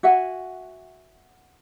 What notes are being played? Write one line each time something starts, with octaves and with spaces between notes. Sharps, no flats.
F#4 E5 F#5 G#5